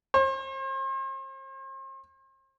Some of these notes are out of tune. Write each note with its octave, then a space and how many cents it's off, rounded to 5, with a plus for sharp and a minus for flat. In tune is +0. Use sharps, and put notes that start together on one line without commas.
C5 +40